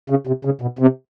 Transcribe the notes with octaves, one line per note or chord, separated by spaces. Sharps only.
C#3
C3
C#3
B2
C3